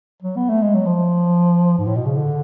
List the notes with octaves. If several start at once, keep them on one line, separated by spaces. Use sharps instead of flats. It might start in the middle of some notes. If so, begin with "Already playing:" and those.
F#3
B3
A3
G#3
F#3
F3
G#2
A2
B2
C#3
D3